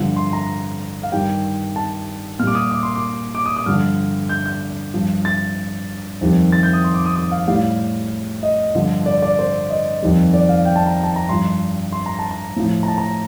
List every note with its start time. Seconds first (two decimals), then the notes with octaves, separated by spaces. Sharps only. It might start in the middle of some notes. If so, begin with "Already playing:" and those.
Already playing: G2 D3 F3
0.16 C6
0.33 A#5
1.03 F5
1.12 G2 D#3 G3 G5
1.76 A5
2.39 A#2 F6
2.43 G3 D6
2.55 D#6
2.71 D6
2.83 C6
2.95 D6
3.35 D6
3.46 D#6
3.56 D#6
3.66 G2 D3 F3 F6
4.29 G6
4.46 G6
4.94 G2 F3
5.25 A6
6.21 F2 D#3 G3
6.52 A6
6.63 G6
6.73 D#6
6.84 C6
6.94 D6
7.05 D#6
7.16 D#6
7.31 F5
7.47 A2 G3 F5
8.43 D#5
8.75 G2 D3 F3
9.06 D5
9.22 D5
9.39 C5
9.70 D#5
10.02 F2 D#3 G3
10.34 D5
10.49 F5
10.65 G5
10.76 A5
10.87 A#5
11.03 A5
11.16 A#5
11.29 G2 F3 C6
11.92 C6
12.06 A#5
12.19 A5
12.31 A#5
12.56 A2 F3
12.83 A#5
12.88 A5
12.98 A#5